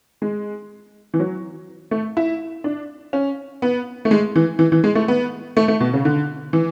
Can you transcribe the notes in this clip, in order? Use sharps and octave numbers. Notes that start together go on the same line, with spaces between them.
G#3
E3
F#3
A3
E4
D4
C#4
B3
A3
G#3
E3
E3
E3
G#3
A3
B3
A3
A3
B2
C#3
D3
E3